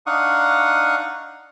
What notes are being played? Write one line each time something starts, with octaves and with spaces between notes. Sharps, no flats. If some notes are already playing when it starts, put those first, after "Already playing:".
D4 D#4 F5 F#5 C#6 D#6